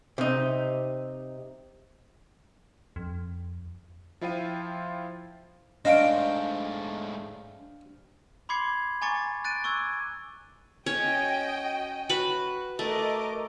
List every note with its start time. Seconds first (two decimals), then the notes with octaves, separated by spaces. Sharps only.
0.18 C3 D#4
2.96 F2
4.21 F3 E4 F4 C5 G5 D#7
5.85 G#2 A3 D4 C5 D#5 F5 G5 D7
8.49 B5 C6 D6 G#6 C7 C#7
9.02 G#5 A#5 C#6 D6 A6 C#7
9.44 F#6 A6 D7 D#7
9.64 C#6 D6 E6 F#6 G#6
10.86 C#4 F#4 C#5 D#5 G5
12.09 F#4 B4 B5
12.79 A3 A#4 D#5 D6